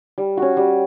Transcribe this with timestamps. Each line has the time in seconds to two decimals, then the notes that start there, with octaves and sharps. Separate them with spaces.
0.18 G3
0.37 C#4 F#4
0.57 G3